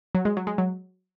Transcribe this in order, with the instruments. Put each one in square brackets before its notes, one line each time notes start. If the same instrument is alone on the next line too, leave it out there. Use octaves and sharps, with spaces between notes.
[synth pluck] F#3
G#3
F#3
G#3
F#3